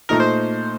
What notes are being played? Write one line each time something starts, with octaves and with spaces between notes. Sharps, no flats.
A#2 A3 D#4 A#4
C5